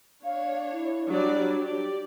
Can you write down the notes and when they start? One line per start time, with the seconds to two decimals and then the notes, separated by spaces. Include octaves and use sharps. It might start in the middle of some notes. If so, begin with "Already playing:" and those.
0.25 D4 C#5 F5
0.73 E4
1.09 F#3 G3 D4 D5
1.60 G4 D5